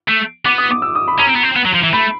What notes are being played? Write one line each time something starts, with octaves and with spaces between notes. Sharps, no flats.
A3
B3 D6
D#6
D6
E6
D#6
B5
C#4 A#5
C4
B3
C4
B3
F#3
F3
E3
A3 B5